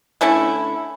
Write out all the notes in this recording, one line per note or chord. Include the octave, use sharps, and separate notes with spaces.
D3 A3 C#4 E4